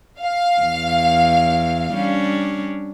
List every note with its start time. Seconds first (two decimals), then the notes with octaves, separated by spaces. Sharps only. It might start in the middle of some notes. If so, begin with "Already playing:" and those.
0.20 F5
0.61 E2
1.94 G3 C#4 D4